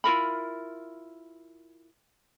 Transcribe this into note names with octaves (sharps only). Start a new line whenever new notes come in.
E4 F4 A#4 B5